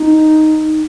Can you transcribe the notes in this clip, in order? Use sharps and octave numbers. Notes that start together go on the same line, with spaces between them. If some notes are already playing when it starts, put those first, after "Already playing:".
Already playing: D#4